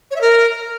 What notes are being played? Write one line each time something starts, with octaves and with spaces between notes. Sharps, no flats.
C#5
E5
A#4